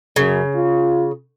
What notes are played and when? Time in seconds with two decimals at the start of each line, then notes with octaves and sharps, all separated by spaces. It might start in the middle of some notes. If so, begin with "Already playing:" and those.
0.16 F#2 C#3
0.55 F4